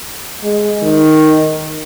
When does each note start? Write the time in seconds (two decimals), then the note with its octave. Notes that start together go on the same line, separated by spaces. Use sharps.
0.43 G#3
0.82 D#3